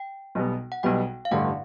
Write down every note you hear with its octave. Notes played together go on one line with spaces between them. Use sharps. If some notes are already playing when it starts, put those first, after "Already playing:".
Already playing: G5
B1 B2 G3 B3
F#5
B1 B2 G3 B3 G5
F5
A1 G2 D3 F#5